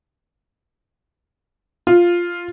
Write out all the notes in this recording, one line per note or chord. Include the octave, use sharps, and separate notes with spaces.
F4